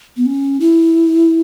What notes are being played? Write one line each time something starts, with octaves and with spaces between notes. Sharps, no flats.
B3
C#4
E4